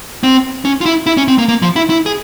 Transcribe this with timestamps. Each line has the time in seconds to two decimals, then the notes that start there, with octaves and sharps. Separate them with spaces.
0.23 C4
0.65 C#4
0.81 F4
0.86 E4
1.06 E4
1.17 C#4
1.28 C4
1.38 A#3
1.48 A#3
1.62 F3
1.76 E4
1.90 E4
2.06 G#4